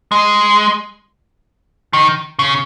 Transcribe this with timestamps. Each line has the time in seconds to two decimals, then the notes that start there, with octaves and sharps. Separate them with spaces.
0.12 G#3
1.93 D#3
2.39 C#3